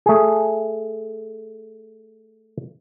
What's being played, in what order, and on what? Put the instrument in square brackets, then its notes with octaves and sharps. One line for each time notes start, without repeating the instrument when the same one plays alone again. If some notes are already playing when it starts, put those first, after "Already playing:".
[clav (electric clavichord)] A3 G#4